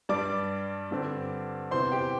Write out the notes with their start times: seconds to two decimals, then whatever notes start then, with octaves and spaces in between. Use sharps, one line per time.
0.09 G2 G3 D4 D5 D6
0.91 G2 D3 C4
1.71 E2 C3 E3 C5 C6
1.92 G4 G5